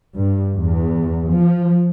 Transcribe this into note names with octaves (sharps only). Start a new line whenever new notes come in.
G2
E2
F3